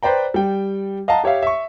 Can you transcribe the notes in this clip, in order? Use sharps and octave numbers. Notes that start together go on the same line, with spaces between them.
B4 C5 D5 G5 A#5
G3 G5
D#5 F5 F#5 A5 A#5
G4 C#5 E5 F5
E5 C#6